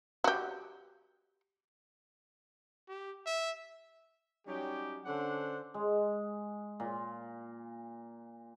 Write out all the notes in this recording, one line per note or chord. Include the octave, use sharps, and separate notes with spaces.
F#4 G4
G4
E5
F#3 G3 C#4 D#4 G4
D3 C#4 D4 A4 C5 F#5
G#3
A#2